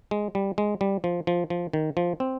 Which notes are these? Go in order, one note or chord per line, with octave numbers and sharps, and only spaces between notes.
G#3
G3
G#3
G3
F3
F3
F3
D#3
F3
C4